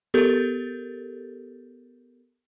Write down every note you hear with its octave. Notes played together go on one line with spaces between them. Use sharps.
B3 G4 A4 A#4 G6 A6